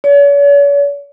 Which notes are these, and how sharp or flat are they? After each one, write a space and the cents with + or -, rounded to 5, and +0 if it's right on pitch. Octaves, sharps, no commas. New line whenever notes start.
C#5 +45